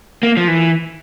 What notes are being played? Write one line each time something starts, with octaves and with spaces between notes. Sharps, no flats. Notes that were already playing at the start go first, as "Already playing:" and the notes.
A#3
F3
E3